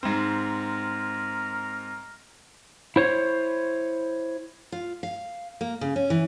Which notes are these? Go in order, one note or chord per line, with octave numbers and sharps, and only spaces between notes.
G#2 C4 A#4
E4 C5 C#5
F4
F5
A#3
C#3
C#4
E3